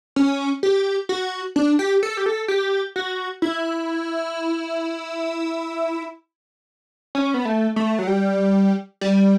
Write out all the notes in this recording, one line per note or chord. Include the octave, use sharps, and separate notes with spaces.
C#4
G4
F#4
D4
G4
A4
G4
A4
G4
F#4
E4
C#4
B3
A3
A3
F#3
G3
G3